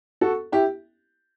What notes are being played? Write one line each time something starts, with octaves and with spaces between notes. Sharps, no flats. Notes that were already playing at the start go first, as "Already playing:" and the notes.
F#4 A4
E4 G4